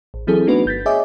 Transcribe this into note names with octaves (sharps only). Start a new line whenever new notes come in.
A1
E3 F#3 C4 E4 G#4 A4
A3 B3 D4 D#4 F#4 B4
G1 G6 A6 B6
G#4 C#5 D#5 E5 G#5 D6